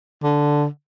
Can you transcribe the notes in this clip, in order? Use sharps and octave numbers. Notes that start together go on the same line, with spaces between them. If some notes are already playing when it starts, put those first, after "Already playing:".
D3